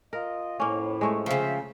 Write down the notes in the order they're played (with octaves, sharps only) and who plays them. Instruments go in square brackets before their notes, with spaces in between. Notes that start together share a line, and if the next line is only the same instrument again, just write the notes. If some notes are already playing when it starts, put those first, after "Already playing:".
[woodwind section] F4 D#5 [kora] A#4
[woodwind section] F2 A2 [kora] A#3 C#4
[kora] G#3 A3 C#5
[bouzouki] C#3 F3 [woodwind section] C4 C5 E5